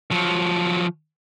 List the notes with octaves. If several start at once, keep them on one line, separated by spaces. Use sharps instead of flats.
F3 F#3